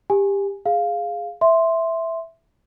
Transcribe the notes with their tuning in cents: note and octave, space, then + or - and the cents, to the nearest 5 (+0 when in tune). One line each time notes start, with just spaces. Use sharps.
G4 +20 G#5 +0
G#4 +0 F5 +0
E5 +0 C6 +0